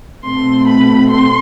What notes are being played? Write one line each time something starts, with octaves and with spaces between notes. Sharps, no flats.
B2 A3 C4 C6
B5
C6